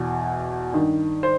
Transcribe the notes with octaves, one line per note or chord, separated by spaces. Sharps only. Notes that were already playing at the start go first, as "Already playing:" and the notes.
Already playing: E2 B2
G2 D#3
C5